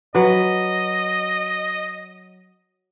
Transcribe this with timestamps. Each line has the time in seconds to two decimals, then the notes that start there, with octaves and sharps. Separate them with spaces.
0.15 F#3 B4 D#5